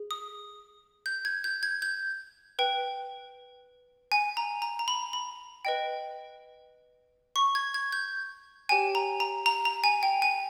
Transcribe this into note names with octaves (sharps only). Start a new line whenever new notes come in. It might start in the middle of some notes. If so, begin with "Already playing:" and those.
Already playing: G#4
D#6
G6
G#6
G6
G#6
G6
B4 G5
G#5
A#5
A#5
A#5
B5
B5
B4 D#5 G5
C#6
G#6
G#6
G6
G4 C#5 G5 G#5
A#5
A#5
A#5
A#5
G#5
G5
G#5